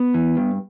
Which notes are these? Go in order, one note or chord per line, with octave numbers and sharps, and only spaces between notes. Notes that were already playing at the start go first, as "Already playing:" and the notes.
Already playing: B3
E3
G2